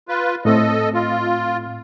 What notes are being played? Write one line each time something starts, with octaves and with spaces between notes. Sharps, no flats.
F4 B4
A2 A3 C4 A4 D#5
F4